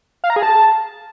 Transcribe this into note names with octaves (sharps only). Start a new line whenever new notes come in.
F5
A#5
G#4
A5